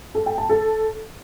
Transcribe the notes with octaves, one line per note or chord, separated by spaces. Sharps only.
A4
G5
A5
A4